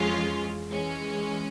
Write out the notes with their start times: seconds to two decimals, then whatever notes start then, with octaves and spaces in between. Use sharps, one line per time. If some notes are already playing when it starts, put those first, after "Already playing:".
Already playing: F2 E3 G#3 C#4 F4
0.69 E3 G#3 C#4